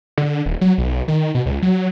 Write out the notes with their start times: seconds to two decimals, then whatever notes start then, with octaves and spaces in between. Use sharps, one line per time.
0.18 D3
0.46 D#1
0.61 F#3
0.78 B1
1.08 D#3
1.35 B2
1.46 C#2
1.62 F#3